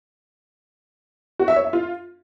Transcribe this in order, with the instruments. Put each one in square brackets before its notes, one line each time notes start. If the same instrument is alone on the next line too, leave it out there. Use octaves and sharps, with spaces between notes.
[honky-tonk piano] F#4
E5
C#5
E5
F4